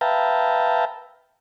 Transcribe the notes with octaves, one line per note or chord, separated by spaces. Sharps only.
B4 E5 F5 G5 A5 A#5